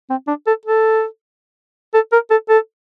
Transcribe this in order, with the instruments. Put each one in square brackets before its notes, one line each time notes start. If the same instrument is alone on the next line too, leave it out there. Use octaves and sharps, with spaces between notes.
[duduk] C4
D4
A4
A4
A4
A#4
A4
A4